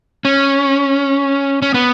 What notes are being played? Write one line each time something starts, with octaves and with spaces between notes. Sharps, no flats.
C#4
C#4
B3